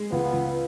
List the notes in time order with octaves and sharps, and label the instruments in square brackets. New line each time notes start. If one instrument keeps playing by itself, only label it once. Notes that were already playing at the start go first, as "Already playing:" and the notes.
Already playing: [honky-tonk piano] G#3
[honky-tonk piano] C#2 [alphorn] B3
[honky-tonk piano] C#2